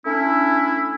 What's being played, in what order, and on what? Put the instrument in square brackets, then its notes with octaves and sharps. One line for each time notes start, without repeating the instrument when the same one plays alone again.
[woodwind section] A3 C#4 D4 E4